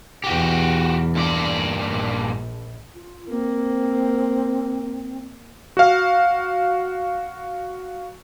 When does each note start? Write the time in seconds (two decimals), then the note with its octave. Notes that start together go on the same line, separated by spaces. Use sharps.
0.24 B1 E2 F#4 G4
1.15 G2 A#2 D5
1.84 A#1
2.95 F4
3.29 A#3 C4
5.77 F#4 F5